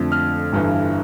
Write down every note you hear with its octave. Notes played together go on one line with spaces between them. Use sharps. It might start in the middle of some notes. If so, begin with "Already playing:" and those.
Already playing: F2 D3 A3
F6
G1 G2 E3